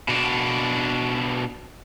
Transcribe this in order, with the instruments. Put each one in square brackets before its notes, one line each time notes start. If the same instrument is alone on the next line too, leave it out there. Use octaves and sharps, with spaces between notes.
[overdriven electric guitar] B2 D4